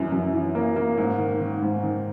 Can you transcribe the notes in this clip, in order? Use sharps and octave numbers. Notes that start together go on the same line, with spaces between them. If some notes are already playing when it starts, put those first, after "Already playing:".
Already playing: F#2 E3
F#2
E3
A#3
A#3
G#2
D#3
D#3
G#2
D#3